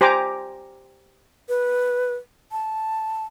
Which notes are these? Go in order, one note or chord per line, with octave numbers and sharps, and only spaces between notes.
G4 C5 G#5 A#5 D6
B4
A5